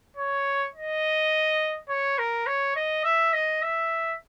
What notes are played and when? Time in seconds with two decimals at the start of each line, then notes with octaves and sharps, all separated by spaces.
0.17 C#5
0.74 D#5
1.89 C#5
2.18 A#4
2.47 C#5
2.76 D#5
3.04 E5
3.33 D#5
3.62 E5